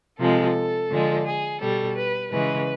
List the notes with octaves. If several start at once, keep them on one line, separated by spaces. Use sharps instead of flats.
C3 F3 G#3 A4
D3 F3 G#3
G#4
B2 G3 A4
B4
C#3 E3 G#3 B4